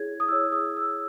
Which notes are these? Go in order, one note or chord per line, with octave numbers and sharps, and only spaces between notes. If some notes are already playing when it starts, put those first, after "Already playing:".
Already playing: E4 G#4 C#5 G#6
D#6
E4 G#4 C#5 E6
D#6
E6